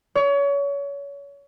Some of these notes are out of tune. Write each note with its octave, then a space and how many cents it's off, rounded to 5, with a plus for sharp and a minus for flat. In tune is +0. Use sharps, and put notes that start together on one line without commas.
C#5 +30